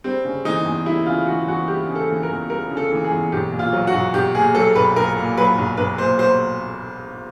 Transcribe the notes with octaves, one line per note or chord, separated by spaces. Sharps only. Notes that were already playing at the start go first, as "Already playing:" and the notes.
G3 C4
C#3
E3 D#4
E2
G3 E4
C#3 F4
E3 F#4
E2 F#4
G3 G4
C#3
A4
E3
A#4
E2
G3 A#4
C#3
A4
E3
G#4
E2
B1 G4
A#2
F4
F#3
F#4
B1
B1 G4
A#2 G#4
F#3 A4
B1 B4
B1 A#4
A#2
F#3 B4
B1
B1 B4
A#2 C5
F#3 C5